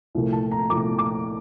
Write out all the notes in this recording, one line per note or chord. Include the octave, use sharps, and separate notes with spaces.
C2 A#2 F3 A3
A5
A#5
C2 A#2 F3 A3 D6
D6